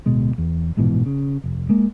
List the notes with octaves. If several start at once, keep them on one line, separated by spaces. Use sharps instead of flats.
D1 B2 G#3
E2
A#1 G#2 B2 E3
C#3
F1
G#3 A#3